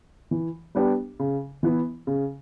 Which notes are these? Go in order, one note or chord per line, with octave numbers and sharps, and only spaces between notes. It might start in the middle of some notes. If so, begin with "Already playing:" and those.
E3
G3 B3 D4 G4
C#3
E3 B3 E4
C#3